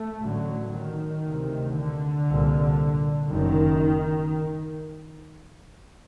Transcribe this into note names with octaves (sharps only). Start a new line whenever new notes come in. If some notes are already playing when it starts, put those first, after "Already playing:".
Already playing: A3
A1 A2 D3 F#3
D#3
D2 C3
D3
C2 A#2
F#1 F#2 D#3